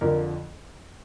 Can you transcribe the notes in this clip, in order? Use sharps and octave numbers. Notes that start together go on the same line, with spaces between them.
F2 D3 F3 A#4